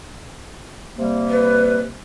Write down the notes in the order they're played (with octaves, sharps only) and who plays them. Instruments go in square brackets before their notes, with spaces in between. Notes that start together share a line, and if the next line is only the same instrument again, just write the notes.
[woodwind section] C3 G3 A#3
[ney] B4